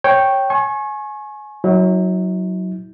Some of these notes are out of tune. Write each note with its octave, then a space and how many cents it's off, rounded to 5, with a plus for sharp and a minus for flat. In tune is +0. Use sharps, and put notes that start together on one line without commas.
C#5 -10 G5 -5
G#5 +25 C#6 -30
F#3 +0 E4 -45